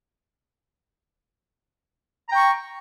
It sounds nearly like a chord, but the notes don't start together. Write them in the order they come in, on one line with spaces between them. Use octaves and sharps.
A#5 G5 C#6